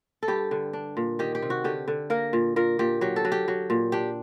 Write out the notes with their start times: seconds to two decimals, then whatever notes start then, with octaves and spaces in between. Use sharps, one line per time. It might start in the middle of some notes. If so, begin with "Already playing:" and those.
0.23 A4
0.28 G2 G4
0.51 D3
0.73 D4
0.97 A#2
1.19 D#3 G4
1.35 G4
1.42 C3
1.50 F#4
1.64 D3 G4
1.88 D3
2.10 A#3 A#4
2.33 A#2
2.56 A#2 A#4
2.79 A#2 G4
3.01 F#3 G4
3.16 A4
3.25 F#3
3.32 G4
3.48 F#3
3.70 A#2
3.92 D4 G4